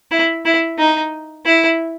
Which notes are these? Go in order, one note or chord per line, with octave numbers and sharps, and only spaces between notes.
E4
E4
D#4
E4